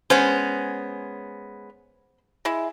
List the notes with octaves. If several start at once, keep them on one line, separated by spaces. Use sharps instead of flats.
G#3 B3 C#4 C5
G#3 E4